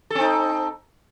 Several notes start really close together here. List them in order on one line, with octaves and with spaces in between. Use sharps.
A4 C4 D#4